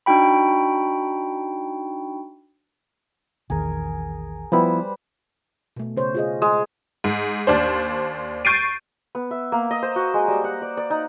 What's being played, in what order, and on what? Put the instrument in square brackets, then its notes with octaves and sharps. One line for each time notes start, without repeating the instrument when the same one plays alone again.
[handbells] D4 D#4 F#4 G5 B5
[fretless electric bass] A#1 E2 D#3 [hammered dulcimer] G#4 A#4
[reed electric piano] F3 B3 E4 [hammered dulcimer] G3 B4 C5
[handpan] B2 A3
C#3 C5 C#5
F4 G#4 D#5
[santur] G#3
[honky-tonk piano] G#2
D#2 D4 C5
C#6 G6 A6 C7 D7 D#7
[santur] B3
E5
A#3
D#5
C5
F#4
G#3
G3
F#5
D5
D5
D#4